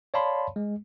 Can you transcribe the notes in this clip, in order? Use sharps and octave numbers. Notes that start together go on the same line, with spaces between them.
C#5 D5 F5 A5 B5 C6
G#3